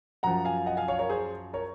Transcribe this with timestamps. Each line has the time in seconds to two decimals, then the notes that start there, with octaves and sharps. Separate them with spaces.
0.23 F#2 F3 F#5 A#5
0.45 F5 G#5
0.66 D#5 F#5
0.77 F5 G#5
0.88 C#5 F5
0.99 A#4 C#5
1.09 G#4 C5
1.53 A#4 C#5